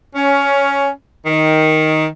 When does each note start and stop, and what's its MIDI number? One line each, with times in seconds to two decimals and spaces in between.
0.16 0.89 61
1.26 2.06 51